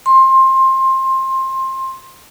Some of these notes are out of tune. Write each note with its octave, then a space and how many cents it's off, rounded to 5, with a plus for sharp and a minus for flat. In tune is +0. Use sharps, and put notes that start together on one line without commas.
C6 +20